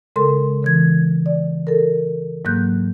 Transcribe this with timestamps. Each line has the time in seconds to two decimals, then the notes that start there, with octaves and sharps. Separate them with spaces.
0.16 C#3 G#3 A4 A#4 C6
0.62 C#3 E3 G#6
1.26 D5
1.67 A4 A#4
2.45 G#2 F#3 A#3 F#6 G6